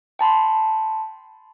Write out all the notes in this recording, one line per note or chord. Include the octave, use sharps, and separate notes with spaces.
G5 A5 B5 C6